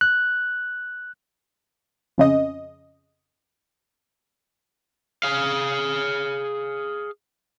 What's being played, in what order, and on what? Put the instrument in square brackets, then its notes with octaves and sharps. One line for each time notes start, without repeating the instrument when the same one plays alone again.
[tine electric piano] F#6
[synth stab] F2 C#3 D#5
[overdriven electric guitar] G#4 F5